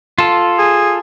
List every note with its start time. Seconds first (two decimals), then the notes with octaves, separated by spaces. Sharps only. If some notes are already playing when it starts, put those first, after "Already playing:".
0.18 F4 A4
0.59 G#4